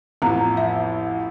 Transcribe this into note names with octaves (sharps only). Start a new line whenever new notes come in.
A1 F2 B3 A#5
E5